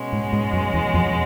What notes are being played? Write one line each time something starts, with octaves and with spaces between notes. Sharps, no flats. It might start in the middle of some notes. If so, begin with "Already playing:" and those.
Already playing: B2 G#3 C#4
G#2
G#2
F#2
E2
F2